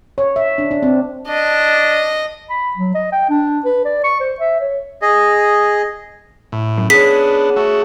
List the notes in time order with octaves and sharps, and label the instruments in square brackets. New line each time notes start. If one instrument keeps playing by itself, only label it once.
[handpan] C#5
E5
D4
D4
C4
[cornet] D4 [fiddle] D#5
[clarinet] B5
F#3
D#5
G5
D4
B4
D5
C#6
C5
E5
C#5
[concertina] G#4 D#5
[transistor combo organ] A2
[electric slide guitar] F#2
[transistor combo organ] B3 D4 [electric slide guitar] G#4 C#5 [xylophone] B6
[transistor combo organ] A3 F#4